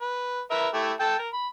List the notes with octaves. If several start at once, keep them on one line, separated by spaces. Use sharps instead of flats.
B4
A#4 B4 E5
A3 E4 G4
A4 G5 A5
A#4
B5